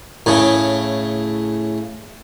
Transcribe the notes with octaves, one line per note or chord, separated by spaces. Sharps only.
A2 C#3